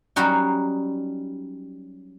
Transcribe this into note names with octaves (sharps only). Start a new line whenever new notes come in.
F#3 G3 C#4 D#4 F#4 G4